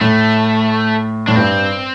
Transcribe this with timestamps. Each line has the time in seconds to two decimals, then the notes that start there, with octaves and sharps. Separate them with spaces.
0.01 A2 A3
1.27 A2 D4
1.36 G2 C4